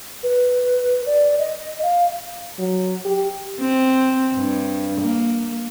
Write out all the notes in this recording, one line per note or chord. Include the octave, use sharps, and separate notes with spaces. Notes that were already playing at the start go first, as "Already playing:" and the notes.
B4
D5
D#5
F5
F#3
G4
C4
G2
A#3